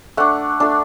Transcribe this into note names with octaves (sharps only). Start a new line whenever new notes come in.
A3 D4 F#5
A3 D4